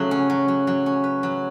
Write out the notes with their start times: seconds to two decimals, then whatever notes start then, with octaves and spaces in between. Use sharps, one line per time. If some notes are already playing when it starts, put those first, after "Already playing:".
Already playing: C#3 F#3 A3
0.11 C#4
0.30 F#3
0.48 F#3
0.67 F#3
0.86 C#4
1.04 B4
1.23 F#3